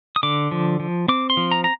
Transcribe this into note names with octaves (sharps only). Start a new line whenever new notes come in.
D#6
D3 D6
F3
F3
C4 D6
C6
F3
A#5
A#5